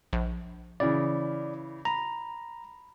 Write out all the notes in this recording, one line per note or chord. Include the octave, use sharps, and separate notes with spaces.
A#1
C#3 E3 D5
A#5 B5